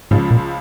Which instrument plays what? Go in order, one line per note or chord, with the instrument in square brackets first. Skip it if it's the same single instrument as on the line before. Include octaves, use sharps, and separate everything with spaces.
[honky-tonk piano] C#2 C#3 F3 [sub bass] G#2
[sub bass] A#2